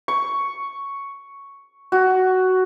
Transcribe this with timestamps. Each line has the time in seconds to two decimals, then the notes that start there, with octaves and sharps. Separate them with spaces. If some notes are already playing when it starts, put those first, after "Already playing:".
0.08 C#6
1.92 F#4